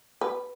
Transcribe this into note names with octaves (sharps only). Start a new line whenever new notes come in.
B4